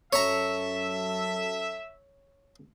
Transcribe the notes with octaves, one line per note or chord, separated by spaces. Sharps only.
F#2 A4 C#5 E5 A#5